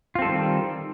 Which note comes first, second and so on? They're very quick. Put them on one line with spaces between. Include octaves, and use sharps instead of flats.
F4 C4 A4 G3 D#3